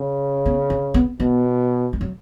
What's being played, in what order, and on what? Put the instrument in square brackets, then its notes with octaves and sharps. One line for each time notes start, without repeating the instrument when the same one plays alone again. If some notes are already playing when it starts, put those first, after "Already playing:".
Already playing: [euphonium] C#3
[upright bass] B3
C#4
B3
[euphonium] B2 [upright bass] B3
[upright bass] G#3
F#3